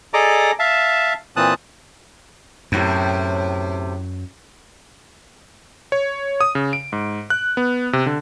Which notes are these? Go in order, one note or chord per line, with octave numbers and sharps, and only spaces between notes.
G#4 A4 D5 D#5 A#5 D6
E5 F5 A5
A#2 E3 C4 A5 D#6 F#6
F#2 A2 C3
C#5
D#6
C#3
D7
G#2
F#6
B3
C3
D3